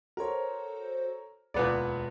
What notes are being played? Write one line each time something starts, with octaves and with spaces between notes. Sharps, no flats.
F#4 A4 A#4 C5 C#5
E1 D2 A#2 B3 D5 B5